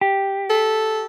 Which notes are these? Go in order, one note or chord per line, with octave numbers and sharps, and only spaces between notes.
G4
A4